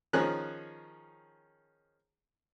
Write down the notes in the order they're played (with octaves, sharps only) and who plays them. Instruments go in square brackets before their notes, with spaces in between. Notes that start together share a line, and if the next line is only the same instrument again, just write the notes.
[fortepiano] D#3 F3 C#4 G#4 F#6